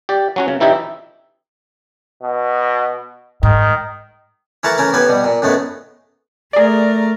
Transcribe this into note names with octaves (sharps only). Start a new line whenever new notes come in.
G4 D5
F#3 C#4 F#4
C#3
E3 D#4 E4 G4 D5 E5
B2
G#2 D#3
E3 A3 E4 A#4 F#5 A5
E3 A3 C#4 A#4
A2 B3 G4 B4 G#5
B2 G3
A#2
F#2 A2 G#3 A3 B3
A3 G#4 A#4 D5